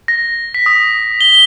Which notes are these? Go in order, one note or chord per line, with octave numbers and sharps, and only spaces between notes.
A#6
B6
D#6
G7